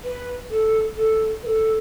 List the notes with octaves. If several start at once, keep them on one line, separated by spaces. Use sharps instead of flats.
B4
A4
A4
B4
A4